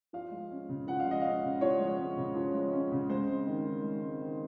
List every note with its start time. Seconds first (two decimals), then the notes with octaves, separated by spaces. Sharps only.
0.13 F3 F5
0.31 G#3
0.50 C#4
0.69 C#3
0.87 F3 F#5
1.00 F5
1.06 G#3
1.11 D#5
1.22 C#4 F5
1.43 C#3
1.61 F3 C#5
1.80 G#3
1.99 C#4
2.17 C#3
2.36 F3
2.54 G#3
2.73 C#4
2.92 C#3
3.09 G#3 C5
3.28 C4
3.47 D#3
3.65 D#3
3.84 G#3
4.03 C4
4.21 D#3